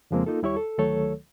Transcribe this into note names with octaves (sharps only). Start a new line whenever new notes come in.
F2 C#3 F3 G#3 A#3 C4
A#3 D#4 F4 A4
D#2 G3 E4 G4 C#5 C#6
A4
D2 D#3 F#3 A3 A4 C#5